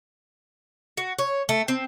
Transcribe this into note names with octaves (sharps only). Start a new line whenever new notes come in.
F#4
C#5
A3
C4